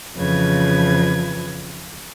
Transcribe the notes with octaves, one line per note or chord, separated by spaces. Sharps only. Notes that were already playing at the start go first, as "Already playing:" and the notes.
F2 C#3 E3 F3 B4 G#6